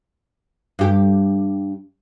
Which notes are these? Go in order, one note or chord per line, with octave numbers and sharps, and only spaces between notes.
G2 G4